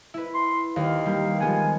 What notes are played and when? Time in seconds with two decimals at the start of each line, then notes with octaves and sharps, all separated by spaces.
0.14 E4 B4
0.34 C6
0.76 D#2 F5
1.06 G3 A#3
1.40 F3 G#3 B3 G#5